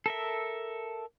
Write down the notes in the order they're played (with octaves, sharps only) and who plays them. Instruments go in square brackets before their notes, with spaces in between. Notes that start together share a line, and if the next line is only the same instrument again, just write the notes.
[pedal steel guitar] A4 A#4 E5